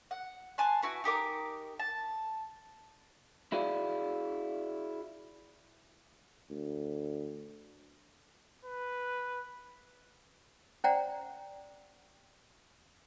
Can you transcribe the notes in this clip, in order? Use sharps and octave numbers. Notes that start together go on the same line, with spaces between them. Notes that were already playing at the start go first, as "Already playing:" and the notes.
F#5
G#5 A5 C6 F#6
E4 F#4 B4
D#4 G4 A#4 D6
A5
E4 F#4 G#4 D5 F5
D2
B4
C#4 C5 D5 F#5 G5 A#5